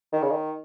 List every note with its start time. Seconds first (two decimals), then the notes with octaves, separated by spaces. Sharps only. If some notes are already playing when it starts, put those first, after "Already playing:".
0.13 D#3
0.22 C#3
0.30 D#3